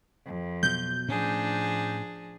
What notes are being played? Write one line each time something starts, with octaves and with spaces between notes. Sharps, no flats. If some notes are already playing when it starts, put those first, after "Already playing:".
F2
B2 F#3 G6
A2 F3 C#4 D4 G#4